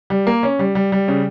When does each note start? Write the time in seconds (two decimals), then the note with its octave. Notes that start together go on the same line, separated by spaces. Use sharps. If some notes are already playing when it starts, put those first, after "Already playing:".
0.10 G3
0.27 A#3
0.43 C#4
0.59 G3
0.75 G3
0.92 G3
1.08 C#3